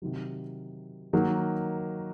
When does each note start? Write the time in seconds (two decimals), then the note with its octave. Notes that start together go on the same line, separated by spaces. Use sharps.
0.02 C3 D#3 F#3
1.13 D#3 F#3 A#3 D#4